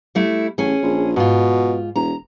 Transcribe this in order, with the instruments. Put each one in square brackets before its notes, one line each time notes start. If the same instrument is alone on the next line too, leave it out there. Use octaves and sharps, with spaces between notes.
[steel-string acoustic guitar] G3 A3 E4
[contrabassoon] A1 [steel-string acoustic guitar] C#4 G#4
[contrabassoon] A#1
[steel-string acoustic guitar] G#2 F4 [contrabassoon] B2
[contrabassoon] E1 [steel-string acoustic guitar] A#5